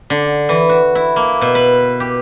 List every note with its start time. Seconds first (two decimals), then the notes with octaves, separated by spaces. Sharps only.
0.10 D3
0.49 E3
0.69 F#4
0.95 E4
1.16 A#3
1.42 B2
1.55 B4
2.00 G4